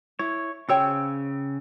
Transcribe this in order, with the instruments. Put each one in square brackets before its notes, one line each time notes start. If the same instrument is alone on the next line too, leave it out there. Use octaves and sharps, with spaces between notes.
[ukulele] E4 [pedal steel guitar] C#5
[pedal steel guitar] C#3 E6 [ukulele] C5 C#5 G5